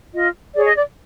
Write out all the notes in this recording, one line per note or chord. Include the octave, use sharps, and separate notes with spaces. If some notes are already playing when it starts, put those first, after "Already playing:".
F4 D#5
G#4 C#5 D5
D#5
D5